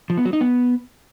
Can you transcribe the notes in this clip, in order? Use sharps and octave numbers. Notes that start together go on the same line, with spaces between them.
F3
B3
F#3
D#4
B3